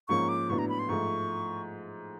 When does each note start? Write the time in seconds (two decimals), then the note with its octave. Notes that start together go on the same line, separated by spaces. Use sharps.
0.08 G#2 F3 A#3 C#4 C#6
0.29 D6
0.49 A2 F#3 B3 D4 C#6
0.58 A#5
0.69 B5
0.79 C6
0.89 G#2 F3 A3 C#6